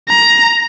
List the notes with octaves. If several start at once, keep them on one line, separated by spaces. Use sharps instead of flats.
A#5